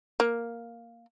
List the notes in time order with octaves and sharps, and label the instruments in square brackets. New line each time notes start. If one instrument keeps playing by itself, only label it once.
[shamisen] A#3